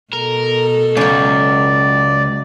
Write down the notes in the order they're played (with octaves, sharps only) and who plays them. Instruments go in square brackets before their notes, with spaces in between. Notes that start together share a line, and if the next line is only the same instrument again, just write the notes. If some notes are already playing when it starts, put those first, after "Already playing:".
[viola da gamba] B2 A4 [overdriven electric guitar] A#4
[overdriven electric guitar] C#2 [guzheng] F#3 C#4 [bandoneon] D5